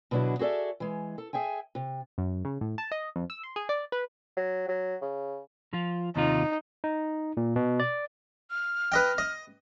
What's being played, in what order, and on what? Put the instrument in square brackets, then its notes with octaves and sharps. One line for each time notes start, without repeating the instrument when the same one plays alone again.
[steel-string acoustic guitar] B2 D3 F#3 D4 E4 F#4
F#4 G#4 A4 D5 E5
E3 G#3
A4
G#4 E5 G5 G#5
C3
[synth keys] F#2
C#3
A2
A5
D#5
F2
E6
C6
G#4
D5
B4
[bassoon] F#3
F#3
C#3
[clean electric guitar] F3 F4
[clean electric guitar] D#2 C3 F4 [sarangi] D#4
[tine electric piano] D#4
A#2
B2
D5
[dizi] F6
[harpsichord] B4 D#5 G5
D#5